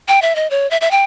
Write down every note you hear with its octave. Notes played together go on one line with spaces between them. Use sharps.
G5
E5
D#5
C#5
E5
E5
G5